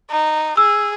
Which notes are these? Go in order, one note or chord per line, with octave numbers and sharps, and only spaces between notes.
D#4
G#4 E6